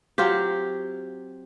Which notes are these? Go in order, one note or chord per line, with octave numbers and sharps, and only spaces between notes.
F#3 C4 F4 G4